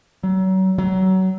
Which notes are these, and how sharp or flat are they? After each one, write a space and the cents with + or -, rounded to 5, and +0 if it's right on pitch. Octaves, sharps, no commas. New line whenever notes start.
F#3 +35
F#3 +25